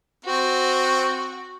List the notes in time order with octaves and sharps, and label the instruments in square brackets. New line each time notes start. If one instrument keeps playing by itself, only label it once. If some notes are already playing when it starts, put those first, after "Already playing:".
[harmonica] C4 [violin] F#4